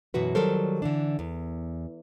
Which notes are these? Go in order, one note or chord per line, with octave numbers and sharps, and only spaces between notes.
F#2 B2 E3 F#4 B4
D#3 F#3 G3 A4 A#4 C5
D3 E3 D4
E2